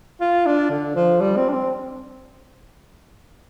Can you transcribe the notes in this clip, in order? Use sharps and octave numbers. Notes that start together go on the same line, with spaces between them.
F4
D4
D3
F3
G3
C4
D4
C4